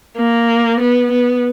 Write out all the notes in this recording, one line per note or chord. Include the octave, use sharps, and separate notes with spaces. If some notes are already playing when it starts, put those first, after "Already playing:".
A#3
B3
B3